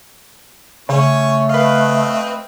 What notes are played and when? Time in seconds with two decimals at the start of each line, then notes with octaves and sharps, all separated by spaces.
0.89 C#3 A3 C#4 C#5 C#6
1.49 C4 B4 D#5 F5